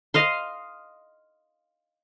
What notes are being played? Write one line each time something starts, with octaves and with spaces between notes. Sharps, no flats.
D#5 F5 C6